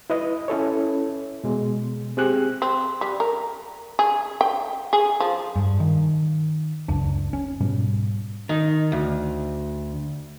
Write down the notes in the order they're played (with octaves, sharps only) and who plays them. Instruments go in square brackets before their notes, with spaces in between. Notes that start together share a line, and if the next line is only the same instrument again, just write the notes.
[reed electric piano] E4 B4 D#5
C#4 E4 A4 C#5
B2 G#3
C4 G4 G#4 F#6
[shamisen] C4
G3
A#4
G#4
G5
G#4
F3
[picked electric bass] G2
D#3
F#1 C#2 D4
C#4
G#2 B2 G3
[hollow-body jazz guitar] D#3
D2